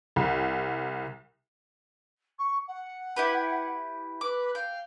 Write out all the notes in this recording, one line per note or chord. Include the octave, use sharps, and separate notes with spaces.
C2
C#6
F#5
E4 G4 B4
B4 D6
F5 G5